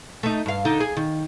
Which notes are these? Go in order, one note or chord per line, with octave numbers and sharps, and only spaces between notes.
A3 D#4
G2 F5
D3 D#4
G#4
D#3